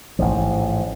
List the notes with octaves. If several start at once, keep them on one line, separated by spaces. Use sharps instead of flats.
A1 G#2 F3